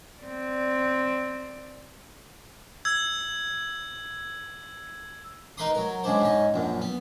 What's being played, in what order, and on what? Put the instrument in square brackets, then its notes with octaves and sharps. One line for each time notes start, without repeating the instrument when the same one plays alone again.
[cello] C4 D5
[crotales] E6 G#6
[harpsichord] D#4 A#4 B4 B5 C6 D#6
F#3 A#4
C#3 G#3 D4 C5
G#2 C#4 D#5
A#1 F#2
B3